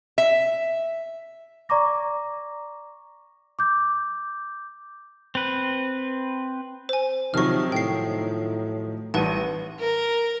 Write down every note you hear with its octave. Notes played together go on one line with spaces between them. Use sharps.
E5
D5 A#5 C#6 D6 A#6
D6 G6
C4 B4
C5 G#5
C3 D#3 F3 F#3 C#6 F6
A2 G5 C7
A1 G3 B4 F#5 A5 D#7
A#4